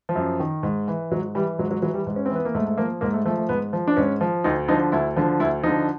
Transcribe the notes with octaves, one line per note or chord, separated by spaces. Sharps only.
F3
F#2
D#3
G#2
E3
G#2 F#3
E3 G3
G#2 F#3
F#3
E3 F#3
G3
G#2
C#4
C4
E3
B3
A#3
G#2 A3
A3
F3 A#3
G#2 A#3
A3
F3 A3
A3
G#2 B3
F3
D4
G#2 C#4
F3
D2 D#4
D3 F3 D#4
D2 E4
D3 F3
D2 E4
D3 F3 D#4